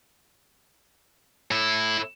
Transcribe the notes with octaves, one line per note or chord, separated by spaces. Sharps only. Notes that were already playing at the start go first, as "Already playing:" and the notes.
A2 E4